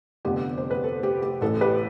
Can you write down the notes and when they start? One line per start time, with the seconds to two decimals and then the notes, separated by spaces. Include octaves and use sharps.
0.25 F1 F2 D3 F3 B3 G4
0.58 C5
0.71 B4
0.84 A4
1.03 G4
1.22 G4
1.42 A1 A2 E3 A4
1.61 G4 B4